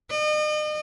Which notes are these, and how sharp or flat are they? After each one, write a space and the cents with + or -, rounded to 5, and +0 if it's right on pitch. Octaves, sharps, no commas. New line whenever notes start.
D#5 -40